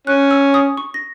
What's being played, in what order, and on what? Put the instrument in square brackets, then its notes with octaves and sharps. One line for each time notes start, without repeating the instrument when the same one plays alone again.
[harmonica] C#4 [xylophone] F#6
[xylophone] E6
D#6
C#6
A#6